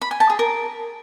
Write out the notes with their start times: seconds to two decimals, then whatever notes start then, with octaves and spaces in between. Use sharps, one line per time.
0.02 B5
0.11 G#5
0.20 A5
0.30 G#4
0.39 A#4